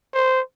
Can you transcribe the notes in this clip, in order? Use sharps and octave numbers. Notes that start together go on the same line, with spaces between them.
C5